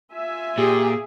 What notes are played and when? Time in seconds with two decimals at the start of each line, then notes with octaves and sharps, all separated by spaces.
0.12 F4 E5 G#5
0.58 A#2 G4 G#4